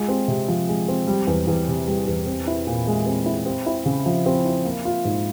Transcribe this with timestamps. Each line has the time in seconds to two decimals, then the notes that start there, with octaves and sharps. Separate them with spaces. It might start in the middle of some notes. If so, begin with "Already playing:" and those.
Already playing: G#3 F4
0.08 C4
0.28 C3
0.48 F3
0.68 G#3
0.88 C4
1.07 G3
1.27 E2
1.47 E2
1.68 C3
1.88 G3
2.07 E2
2.26 C4
2.47 E4
2.67 A#2
2.87 G#3
3.06 C4
3.26 E4
3.46 C4
3.66 E4
3.85 C#3
4.06 F3
4.26 C4
4.45 E4
4.65 A#3
4.85 F4
5.05 G#2